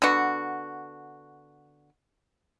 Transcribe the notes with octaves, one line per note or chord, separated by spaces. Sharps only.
D3 B3 F#4